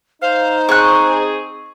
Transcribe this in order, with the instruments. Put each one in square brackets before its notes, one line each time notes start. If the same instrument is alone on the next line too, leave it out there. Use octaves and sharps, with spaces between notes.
[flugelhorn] D#4 [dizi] C5 [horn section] F5
[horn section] C4 G#4 [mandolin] C#6 F#6